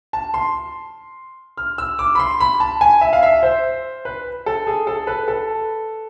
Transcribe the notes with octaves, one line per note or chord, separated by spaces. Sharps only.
A5
C6
F6
E6
D6
B5
C6
B5
A5
G#5
E5
F5
E5
C5
B4
A4
G#4
A4
B4
A4